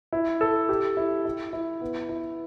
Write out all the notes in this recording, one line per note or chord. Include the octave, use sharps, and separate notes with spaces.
E4
A4
G4
E4
E4
E4
B3
E4